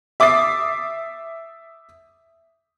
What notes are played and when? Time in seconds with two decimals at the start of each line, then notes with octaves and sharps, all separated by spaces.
0.20 E5 D6 D#6 A6 C7